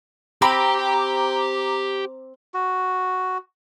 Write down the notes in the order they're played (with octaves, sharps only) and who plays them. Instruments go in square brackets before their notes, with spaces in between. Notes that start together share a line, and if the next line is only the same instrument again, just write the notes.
[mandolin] C4 B5 [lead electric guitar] G4 G5 [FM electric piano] A#5 D6
[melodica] F#4